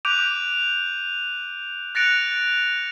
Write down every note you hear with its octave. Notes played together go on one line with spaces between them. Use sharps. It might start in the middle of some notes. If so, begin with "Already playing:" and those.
D6 F#6 G6 D7 D#7 F7
F#6 A6 A#6 C#7 D7 F7